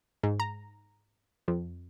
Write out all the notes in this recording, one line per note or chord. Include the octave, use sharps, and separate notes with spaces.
G#2
A#5
F2